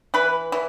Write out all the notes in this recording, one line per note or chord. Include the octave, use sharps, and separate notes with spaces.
E3 B4
E3